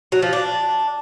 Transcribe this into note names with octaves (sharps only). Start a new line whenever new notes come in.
F#3
F3
D4